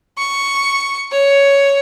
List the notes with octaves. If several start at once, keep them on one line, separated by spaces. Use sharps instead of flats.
C#6
C#5